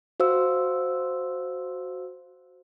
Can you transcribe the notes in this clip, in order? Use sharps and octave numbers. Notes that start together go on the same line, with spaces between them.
F#4 C5 F5 E6